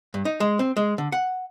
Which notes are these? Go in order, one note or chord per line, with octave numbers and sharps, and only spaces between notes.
G2
D#4
G#3
C4
G#3
D3
F#5